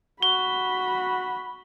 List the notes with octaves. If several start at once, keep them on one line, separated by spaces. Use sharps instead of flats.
F#4 B5 G7